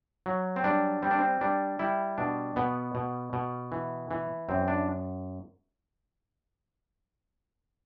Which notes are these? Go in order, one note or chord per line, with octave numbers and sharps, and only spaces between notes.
F#3
C4
G3 D4
G3 C4
D4
C4
G3 D4
G3 E4
B2 D4
B2 B3
B2
B2
E3
E3
F#2 C4
D4